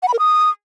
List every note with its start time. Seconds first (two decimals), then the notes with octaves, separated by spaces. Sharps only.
0.03 F#5
0.08 B5
0.14 A#4
0.19 D#6